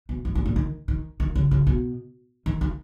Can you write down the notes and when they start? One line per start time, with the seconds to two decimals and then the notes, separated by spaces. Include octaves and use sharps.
0.09 B2
0.25 G2
0.35 A#2
0.46 A#2
0.56 D#3
0.88 D#3
1.20 D#3
1.35 C#3
1.51 C#3
1.67 B2
2.46 D#3
2.61 D#3